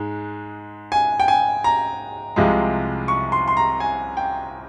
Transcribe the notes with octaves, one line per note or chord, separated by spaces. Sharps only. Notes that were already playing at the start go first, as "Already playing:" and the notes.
Already playing: G#2 G#3
G#5
G5
G#5
A#5
C2 C3 F3 G#3
C#6
C6
C6
A#5
G#5
G5